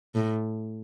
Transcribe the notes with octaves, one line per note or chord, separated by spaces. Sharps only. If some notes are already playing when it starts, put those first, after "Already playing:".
A2